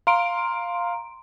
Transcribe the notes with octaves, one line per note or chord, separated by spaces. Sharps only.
F5 A#5 C6 D7